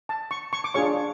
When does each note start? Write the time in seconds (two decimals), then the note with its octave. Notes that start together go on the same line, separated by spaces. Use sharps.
0.09 A5
0.31 C#6
0.53 C#6
0.64 D6
0.74 D4 F4 G#4 C#5 C#6